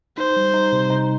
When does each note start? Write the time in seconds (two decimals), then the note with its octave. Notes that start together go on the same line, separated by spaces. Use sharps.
0.17 D#4 C5
0.36 G3
0.54 D#4
0.72 C3
0.90 D#4